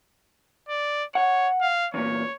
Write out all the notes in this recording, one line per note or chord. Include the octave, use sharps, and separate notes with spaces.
D5
C#5 F#5
F5
E2 A#2 C#5